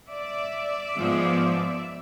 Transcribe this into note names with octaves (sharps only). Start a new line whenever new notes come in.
D5 E5
G#2 F3 G#3 B3